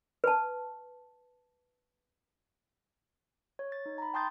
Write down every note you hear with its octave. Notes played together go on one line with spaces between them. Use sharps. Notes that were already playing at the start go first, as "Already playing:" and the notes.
B4 A5
C#5
A6
D#4
A#5 B5
G5 A5 C6 D#6 G6 A6